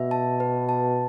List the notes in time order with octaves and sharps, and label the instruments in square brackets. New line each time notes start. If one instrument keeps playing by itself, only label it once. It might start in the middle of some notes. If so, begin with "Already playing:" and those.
Already playing: [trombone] B2 [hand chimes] E5
[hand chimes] A5
B4
A5